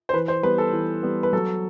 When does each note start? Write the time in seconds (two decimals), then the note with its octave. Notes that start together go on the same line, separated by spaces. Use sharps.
0.09 C5
0.13 E3 B4
0.28 C5
0.43 G3 B3 B4
0.58 A4
0.73 E3
1.03 G3 B3
1.23 B4
1.33 F#3 A4